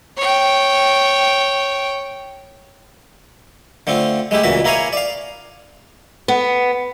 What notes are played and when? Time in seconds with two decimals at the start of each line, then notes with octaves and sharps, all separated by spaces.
0.17 C#5 G5
3.87 D3 A3 C4 F4
4.31 G#3 A3 E4 G4
4.43 C#2 A#2 E3 F#4 E5
4.64 A#3 E4 A#4 C#5 F5 G#5
4.93 D5 F5
6.28 B3